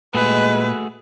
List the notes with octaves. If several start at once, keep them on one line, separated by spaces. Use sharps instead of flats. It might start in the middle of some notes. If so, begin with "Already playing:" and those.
A#2 G#3 A3 F#4 G#4 B4